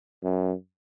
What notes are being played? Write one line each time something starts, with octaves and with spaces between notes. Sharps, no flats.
F#2